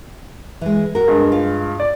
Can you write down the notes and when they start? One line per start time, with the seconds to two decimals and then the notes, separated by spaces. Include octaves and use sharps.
0.61 E3 G#3
0.95 F#4 A#4
1.08 G2 G#3
1.32 F4
1.80 D5